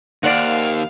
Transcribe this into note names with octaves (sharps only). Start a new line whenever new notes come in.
D#2 D#3 C5 D5 F5 F#5 F#6